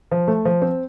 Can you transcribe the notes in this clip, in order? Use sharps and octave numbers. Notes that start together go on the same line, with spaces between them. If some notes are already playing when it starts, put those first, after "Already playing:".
F3
A3
F3
C4